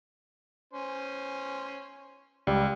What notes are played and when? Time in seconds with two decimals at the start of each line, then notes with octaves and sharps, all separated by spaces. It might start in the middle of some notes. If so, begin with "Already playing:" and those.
0.73 C#4 C5
2.47 C#2 G3